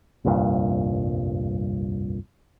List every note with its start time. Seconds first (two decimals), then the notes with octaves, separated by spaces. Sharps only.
0.25 F1 C2 G2 A#2